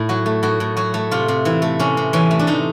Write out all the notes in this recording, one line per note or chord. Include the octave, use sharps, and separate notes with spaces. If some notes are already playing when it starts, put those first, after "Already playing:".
Already playing: A2 E4
F#3 F#4
A3
A2 F#4
A2
F#3 F#4
A3
C3 F4
C3
E3 E4
A3
C3 C#4
C3
E3 C#4
A3
D4
C3 D#4